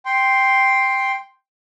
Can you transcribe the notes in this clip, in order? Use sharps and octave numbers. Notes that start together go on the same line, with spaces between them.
G5 C6